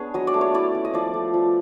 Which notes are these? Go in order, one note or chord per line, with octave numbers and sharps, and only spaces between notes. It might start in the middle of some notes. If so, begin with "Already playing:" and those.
Already playing: B3 D4 G#4 C#5
F#3 D#5
D5
A3
C#5
E4 D5
C#4
D#5
F3 D5
A3
F3